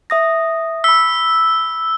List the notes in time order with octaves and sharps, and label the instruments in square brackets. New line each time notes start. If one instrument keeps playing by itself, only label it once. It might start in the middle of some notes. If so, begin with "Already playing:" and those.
[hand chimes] E5 D#6 A#6
[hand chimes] B5 B6 [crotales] E6